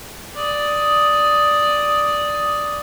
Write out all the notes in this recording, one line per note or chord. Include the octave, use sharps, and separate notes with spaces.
D5 D#6